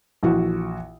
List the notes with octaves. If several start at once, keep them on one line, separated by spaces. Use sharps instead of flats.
A#1 E3 F#4